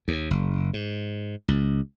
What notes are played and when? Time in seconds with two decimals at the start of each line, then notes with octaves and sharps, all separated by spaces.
0.08 D#2
0.31 F#1
0.73 G#2
1.48 C#2